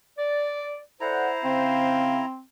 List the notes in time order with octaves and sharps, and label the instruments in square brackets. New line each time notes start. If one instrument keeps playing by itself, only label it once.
[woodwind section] D5
[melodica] E4 A#5 [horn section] A4 D5 F#5 [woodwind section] C5
[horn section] C#3 F5 [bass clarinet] C4